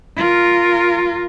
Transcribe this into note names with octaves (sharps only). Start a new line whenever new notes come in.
F4 A#4